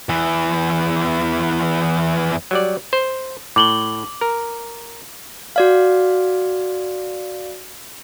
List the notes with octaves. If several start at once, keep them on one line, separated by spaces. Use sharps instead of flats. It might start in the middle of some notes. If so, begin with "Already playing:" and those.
E2 E3
F#3 G3 D5
C5
A2 D6 F#7 G7
A#4
F#4 D5 F5